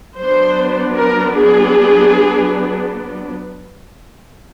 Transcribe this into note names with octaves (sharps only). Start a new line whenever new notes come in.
F#3 B3 D4 C5
A#4
G#4